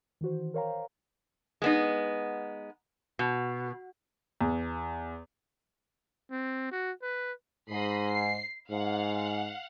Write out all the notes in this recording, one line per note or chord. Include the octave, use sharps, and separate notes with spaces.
D#3 E3 F#4 C5
A#4 C5 C#5 F5 G5 A#5
G#3 B3 D#4
B2
E2
C4
F#4
B4
G#2 D#5 B5 C7
C7
G#2 F5 F#5